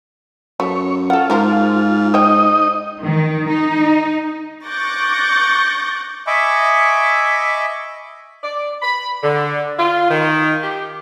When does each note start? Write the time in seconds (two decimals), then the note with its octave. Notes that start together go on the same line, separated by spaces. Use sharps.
0.60 F#2 A3 C#5
1.10 F4 A4 F#5
1.30 G#2 F3 A#4 C5
2.14 D#4 C5 C#5 D#5 G5
3.02 D#3
3.49 D#4
4.66 C#6 D6 F#6 G6 A6 A#6
6.27 D#5 E5 G#5 B5 C#6 D6
8.43 D5
8.82 B5
9.23 D3
9.78 F4
10.09 D#3
10.63 G4